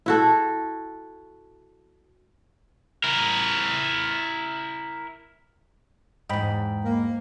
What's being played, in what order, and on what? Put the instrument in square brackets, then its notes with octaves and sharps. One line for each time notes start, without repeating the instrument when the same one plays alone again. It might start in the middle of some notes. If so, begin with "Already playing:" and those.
[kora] E4 F#4 A4
[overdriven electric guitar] E4 A#4
[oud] E2 G#2 [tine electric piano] D#5 G5 B5
[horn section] A#3